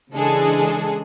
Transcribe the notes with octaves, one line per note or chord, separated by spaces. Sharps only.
C#3 E3 G#3 D4 G#4 A4